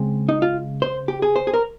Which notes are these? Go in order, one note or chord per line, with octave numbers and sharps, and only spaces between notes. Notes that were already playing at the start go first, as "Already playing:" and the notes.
Already playing: C#3 G#3 C4
D#4
F4
C5
G4
G#4
C5
G#4
A#4